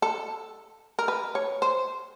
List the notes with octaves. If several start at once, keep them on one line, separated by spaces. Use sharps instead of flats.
A4
A#4
B4
C#5
C5